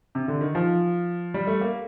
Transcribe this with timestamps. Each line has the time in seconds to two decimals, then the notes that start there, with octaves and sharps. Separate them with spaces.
0.15 C3
0.28 D3
0.41 D#3
0.55 F3
1.34 G3
1.47 A3
1.61 A#3